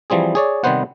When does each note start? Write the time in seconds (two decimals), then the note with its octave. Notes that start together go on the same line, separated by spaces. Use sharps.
0.10 E3 F3 G3 C4 G#4
0.35 G#4 C#5 D5
0.64 C3 D#3 G3 B3 C5 F#5